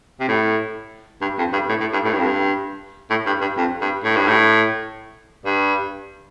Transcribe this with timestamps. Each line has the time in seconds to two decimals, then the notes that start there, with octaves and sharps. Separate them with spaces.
0.20 C3
0.28 A2
1.22 G2
1.39 F2
1.53 G2
1.69 A2
1.81 A2
1.93 G2
2.05 A2
2.13 G2
2.19 F2
2.27 G2
3.10 A2
3.27 G2
3.41 G2
3.58 F2
3.81 G2
4.04 A2
4.16 G2
4.28 A2
5.46 G2